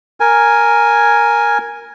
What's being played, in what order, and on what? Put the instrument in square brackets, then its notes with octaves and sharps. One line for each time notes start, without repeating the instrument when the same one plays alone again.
[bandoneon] A#4 G#5